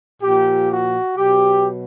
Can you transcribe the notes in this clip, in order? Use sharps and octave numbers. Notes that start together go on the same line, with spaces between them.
A#2 F3 G4
F#4
B2 F#3 G4